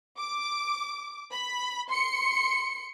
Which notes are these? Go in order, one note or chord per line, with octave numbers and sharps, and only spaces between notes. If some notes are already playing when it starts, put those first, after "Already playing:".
D6
B5
C6 C#7